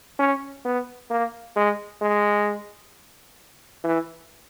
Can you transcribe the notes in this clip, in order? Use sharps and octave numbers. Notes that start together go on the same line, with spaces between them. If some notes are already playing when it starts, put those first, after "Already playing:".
C#4
B3
A#3
G#3
G#3
E3